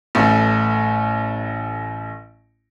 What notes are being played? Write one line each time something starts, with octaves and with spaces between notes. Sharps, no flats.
A1 A3